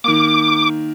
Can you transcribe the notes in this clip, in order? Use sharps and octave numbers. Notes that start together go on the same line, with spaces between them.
D#3 A#3 D6